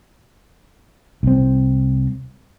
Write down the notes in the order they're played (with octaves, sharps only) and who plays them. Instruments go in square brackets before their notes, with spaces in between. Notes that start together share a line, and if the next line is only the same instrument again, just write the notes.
[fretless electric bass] C2 C4